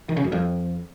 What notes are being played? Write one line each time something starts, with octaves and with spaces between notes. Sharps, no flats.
D#3
C#3
F#2
F2